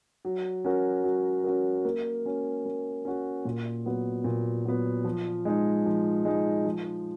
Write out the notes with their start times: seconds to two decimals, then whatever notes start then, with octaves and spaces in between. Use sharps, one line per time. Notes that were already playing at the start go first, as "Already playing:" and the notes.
0.25 F#3
0.64 C#4 F#4 A#4
1.04 F#3
1.44 C#4 F#4 A#4
1.85 A#3
2.25 C#4 F#4
2.65 A#3
3.05 C#4 F#4
3.45 A#2
3.85 F#3 B3
4.24 A#2
4.65 F#3 B3
5.04 F3
5.45 G#3 D#4
5.86 F3
6.25 G#3 D#4
6.65 F3